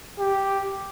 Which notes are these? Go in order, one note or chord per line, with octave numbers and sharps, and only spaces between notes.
G4